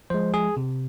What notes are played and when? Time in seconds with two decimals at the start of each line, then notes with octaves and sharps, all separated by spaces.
0.10 F3 G#3 C5
0.34 G#4
0.57 C3